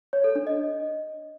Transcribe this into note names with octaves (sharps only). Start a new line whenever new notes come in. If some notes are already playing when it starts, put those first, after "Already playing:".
C#5
A4
D4
D#5